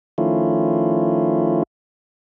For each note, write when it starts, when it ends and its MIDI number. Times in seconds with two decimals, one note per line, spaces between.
0.18 1.63 51
0.18 1.63 53
0.18 1.63 57
0.18 1.63 61
0.18 1.63 64
0.18 1.63 65